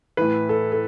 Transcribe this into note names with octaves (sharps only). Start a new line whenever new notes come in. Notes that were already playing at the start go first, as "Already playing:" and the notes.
A2 E3 B4
A4
A4